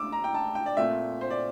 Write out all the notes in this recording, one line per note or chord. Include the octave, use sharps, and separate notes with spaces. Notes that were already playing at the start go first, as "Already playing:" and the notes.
Already playing: D4 D6 E6
A#5
G5
A5
G5
D5
A#2 A3 C4 E5
C5
D5